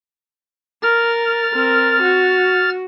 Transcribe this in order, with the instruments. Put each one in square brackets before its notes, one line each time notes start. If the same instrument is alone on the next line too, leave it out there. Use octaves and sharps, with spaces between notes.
[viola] A#4 [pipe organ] F6 A6
[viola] C4 A#4
F#4